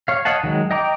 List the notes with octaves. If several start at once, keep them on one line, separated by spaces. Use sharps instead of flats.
C#5 F5
C#5 D#5 F5 F#5 A5
D#3 F#3 G#3
D#5 G5 A#5 D6